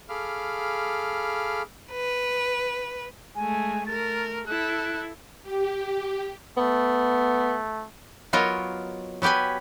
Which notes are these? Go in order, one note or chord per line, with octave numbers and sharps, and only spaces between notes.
G#4 A4 F5 B5 D6 F6
B4
G#3 A3 G#5
A3 A#4 A6
E4 A4 F#6
G4
A3 B3
F#3 B3 F4 A#4 C#5 D#5
F#3 B3 G4 B4 G#5